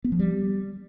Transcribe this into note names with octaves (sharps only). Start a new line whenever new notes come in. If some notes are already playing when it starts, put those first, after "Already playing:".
B3
F3
G3